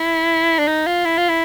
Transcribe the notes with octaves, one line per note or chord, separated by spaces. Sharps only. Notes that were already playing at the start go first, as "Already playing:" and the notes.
Already playing: E4
D4
D#4
F4
E4
F4
E4